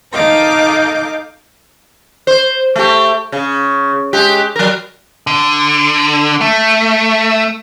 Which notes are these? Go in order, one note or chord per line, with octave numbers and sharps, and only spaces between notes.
D#4 A4 D#5 F5 D6 G6
C5
A3 G4
C#3
G#3 G4
F#3 A#4
D3
A3